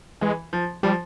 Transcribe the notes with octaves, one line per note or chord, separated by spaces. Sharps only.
E3 G#3
F3
F3 G3